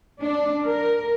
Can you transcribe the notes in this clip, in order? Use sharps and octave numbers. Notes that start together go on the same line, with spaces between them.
D4
A#4